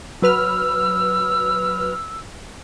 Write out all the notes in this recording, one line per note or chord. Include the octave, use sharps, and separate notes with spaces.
F#3 B4 E6 F6